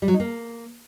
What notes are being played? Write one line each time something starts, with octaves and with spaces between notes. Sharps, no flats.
G3
F#3
D#4
A#3